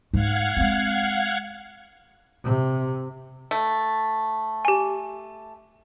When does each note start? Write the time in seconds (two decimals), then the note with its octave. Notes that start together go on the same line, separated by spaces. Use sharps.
0.13 G#2 G#3 F5 F#5 G#6
0.57 G#3 C4
2.44 C3
3.51 A3
4.65 G4 G#5